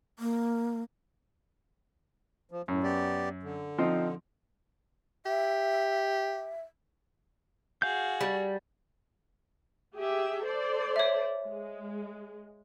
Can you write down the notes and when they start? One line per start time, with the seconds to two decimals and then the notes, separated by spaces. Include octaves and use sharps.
0.19 A#3
2.51 F3
2.68 F#2 A2
2.83 B3 G4 D5
3.43 D3
3.78 F3 C4 D#4
5.26 G4 E5
7.82 F#4 G#4 F5 G6
8.21 G3
9.95 G4 G#4 E5
10.44 A4 C5 D5
10.96 C#5 E5
11.45 G#3